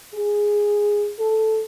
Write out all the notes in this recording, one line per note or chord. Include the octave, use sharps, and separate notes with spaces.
G#4
A4